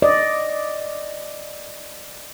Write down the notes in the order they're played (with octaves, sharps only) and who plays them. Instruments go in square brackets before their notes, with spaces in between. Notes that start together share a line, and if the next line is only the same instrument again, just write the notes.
[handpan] D5 D#5